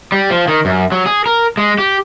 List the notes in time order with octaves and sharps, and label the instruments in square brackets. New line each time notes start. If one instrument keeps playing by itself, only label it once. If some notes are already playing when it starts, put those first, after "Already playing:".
[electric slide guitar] G3
F3
D#3
F#2
F#3
G#4
A#4
G#3
G4